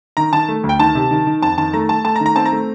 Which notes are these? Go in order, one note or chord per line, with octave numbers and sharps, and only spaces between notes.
D#3 A#5
D#3 A5
A3
D2
G5
D#3 A5
C3
D#3
D#3
F2 A5
D#3 A5
A3 A#5
A3 A5
A3 A5
A#5
D#3
A#5
C4 A5
A#5
A3